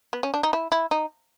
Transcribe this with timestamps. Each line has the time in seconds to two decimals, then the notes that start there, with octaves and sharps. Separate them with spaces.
0.13 B3
0.23 C#4
0.34 D4
0.43 D#4
0.53 E4
0.72 E4
0.91 D#4